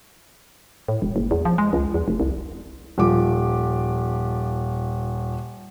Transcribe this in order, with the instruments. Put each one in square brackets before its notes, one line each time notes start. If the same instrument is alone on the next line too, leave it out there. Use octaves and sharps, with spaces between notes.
[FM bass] A2
E1
F#1
E2
F3
G#3
C#2
E2
F1
C2
[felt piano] D#1 F3 D6